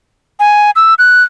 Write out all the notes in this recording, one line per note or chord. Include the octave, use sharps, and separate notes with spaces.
G#5
E6
F#6